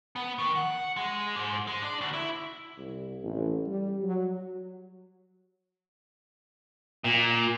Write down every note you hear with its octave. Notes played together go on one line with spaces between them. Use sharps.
B3
D#3
F#5
G#3
G#2
G#3
D4
D2
E4
C2
A1
G3
F#3
A#2